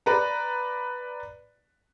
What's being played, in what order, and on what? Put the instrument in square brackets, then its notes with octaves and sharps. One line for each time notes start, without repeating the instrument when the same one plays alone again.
[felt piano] B4 D5 A#5